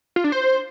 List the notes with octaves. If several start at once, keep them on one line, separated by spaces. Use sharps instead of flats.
F4
D4
C5